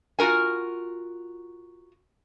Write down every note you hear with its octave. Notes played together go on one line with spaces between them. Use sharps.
F4 F#4 A#4 G#5